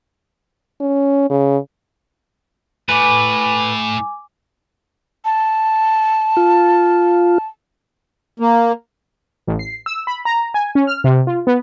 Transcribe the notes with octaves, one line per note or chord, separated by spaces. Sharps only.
C#4
C#3
A2 B4 G#5 D6
A5
F4
A#3
A1
C7
E6
B5
A#5
G#5
C#4
F6
C3
F4
B3